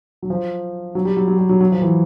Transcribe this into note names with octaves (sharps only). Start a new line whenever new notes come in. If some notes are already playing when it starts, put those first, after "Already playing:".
F#3
F3
F#3
G3
F#3
F#3
G3
F#3
F#3
F3
E3